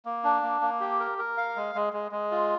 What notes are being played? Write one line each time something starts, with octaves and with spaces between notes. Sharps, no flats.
A#3
D4
A#3
A#3
G4
A#4
A#4
F5
G#3
G#3
G#3
G#3
F4